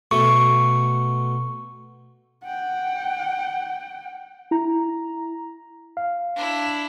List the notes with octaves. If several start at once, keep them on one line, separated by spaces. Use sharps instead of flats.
B2 A3 C#6
F#5 G5
E4 A#5
F5
D4 E4